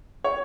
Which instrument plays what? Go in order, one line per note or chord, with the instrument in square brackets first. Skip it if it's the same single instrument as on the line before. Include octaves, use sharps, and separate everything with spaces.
[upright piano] C#5